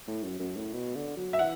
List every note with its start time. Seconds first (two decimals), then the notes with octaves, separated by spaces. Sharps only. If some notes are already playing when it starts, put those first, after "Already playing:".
0.08 A2
0.24 F#2
0.40 F#2
0.57 A2
0.73 B2
0.96 D3
1.17 F#3
1.33 E5
1.39 E3 F#5